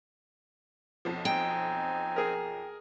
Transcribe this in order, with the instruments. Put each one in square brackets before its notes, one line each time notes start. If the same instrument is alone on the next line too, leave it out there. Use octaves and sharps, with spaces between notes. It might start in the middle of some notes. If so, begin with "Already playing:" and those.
[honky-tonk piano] B1 F2 F3
[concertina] C4 D#4 G#5 [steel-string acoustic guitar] G5
[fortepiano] G#4 A#4